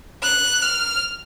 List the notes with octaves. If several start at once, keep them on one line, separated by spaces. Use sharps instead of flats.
F#6
F6